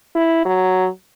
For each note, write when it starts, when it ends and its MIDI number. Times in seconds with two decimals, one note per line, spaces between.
0.16 0.44 64
0.46 0.88 54